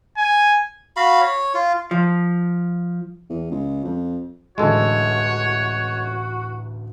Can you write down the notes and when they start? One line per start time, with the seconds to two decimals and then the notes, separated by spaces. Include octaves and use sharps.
0.17 G#5
0.96 F#4 F5 B5
1.21 C#5
1.54 F4
1.91 F3
3.30 E2
3.51 C#2
3.84 F2
4.58 D1 A1 D3 G#3 F#4 A4 C#5